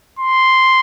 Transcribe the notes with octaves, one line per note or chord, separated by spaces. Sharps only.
C6